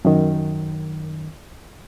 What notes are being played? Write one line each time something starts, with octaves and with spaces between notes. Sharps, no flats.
F#2 D#3